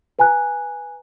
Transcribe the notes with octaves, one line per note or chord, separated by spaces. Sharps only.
B4 G#5 A#5 F#6